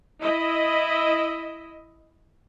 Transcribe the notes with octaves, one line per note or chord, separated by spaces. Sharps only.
E4 D#5